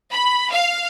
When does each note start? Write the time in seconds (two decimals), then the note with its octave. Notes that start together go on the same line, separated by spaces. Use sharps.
0.11 B5
0.51 F5